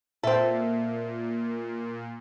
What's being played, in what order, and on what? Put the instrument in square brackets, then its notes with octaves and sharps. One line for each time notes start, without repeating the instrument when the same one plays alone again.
[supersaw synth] A#2 [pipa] C4 A4 [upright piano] E5